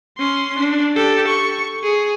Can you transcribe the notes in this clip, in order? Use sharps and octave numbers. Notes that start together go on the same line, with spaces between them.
C#4 C6
D4
G4 A4
C#6
G#4